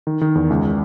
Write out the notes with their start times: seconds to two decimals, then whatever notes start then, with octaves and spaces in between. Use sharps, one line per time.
0.07 D#3
0.21 D#3
0.35 E2
0.50 C#2